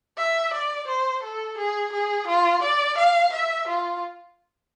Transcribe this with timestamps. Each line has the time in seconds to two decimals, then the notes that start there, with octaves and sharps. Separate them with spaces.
0.18 E5
0.53 D5
0.87 C5
1.23 A4
1.58 G#4
1.93 G#4
2.27 F4
2.63 D5
2.97 F5
3.33 E5
3.68 F4